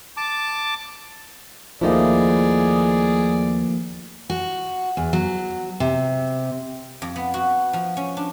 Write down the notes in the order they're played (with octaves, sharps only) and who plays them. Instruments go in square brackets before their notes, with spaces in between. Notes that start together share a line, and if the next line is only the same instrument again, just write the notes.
[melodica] A5 D6
[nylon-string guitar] D#2 D#4 E4 [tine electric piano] F3 A3 A#3 [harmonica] G#4 D5
[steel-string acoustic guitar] F#4
E2
F#3
C3
[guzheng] F2
B3
F#4
F3
C#4
D4